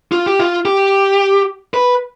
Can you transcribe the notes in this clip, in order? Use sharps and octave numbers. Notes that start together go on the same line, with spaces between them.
F4
G4
F4
G4
B4